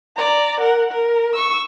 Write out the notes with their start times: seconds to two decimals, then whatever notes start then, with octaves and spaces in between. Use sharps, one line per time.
0.17 D5 A#5
0.60 A#4 F#5
0.91 A#4
1.34 C#6 E6